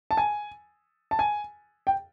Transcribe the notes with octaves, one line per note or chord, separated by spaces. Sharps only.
A5
G#5
A5
G#5
G5